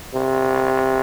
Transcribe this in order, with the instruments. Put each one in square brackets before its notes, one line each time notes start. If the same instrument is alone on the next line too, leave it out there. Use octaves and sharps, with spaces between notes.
[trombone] C3